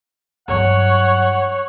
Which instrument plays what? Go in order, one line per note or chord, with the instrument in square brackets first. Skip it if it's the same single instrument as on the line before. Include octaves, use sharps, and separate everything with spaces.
[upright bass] G2 F#3 [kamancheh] C#5 [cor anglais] F#5